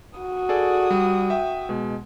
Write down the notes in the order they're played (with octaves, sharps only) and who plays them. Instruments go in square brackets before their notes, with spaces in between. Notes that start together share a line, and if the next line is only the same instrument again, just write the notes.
[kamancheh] F#4 D#6
[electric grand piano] G#4 A4 D5
G3
E5 G5
B2 G#3